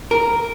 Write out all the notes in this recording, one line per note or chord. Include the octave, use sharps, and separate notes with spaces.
A#4